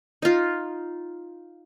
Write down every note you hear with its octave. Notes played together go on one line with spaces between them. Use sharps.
D#4 F4